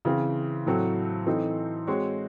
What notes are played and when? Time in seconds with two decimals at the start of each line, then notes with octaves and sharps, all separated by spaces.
0.05 C#3 E3 C4
0.66 A2 F#3 C4 F#4 A4
1.27 E3 C4 D#4 A4
1.87 G#3 C4 F#4 C#5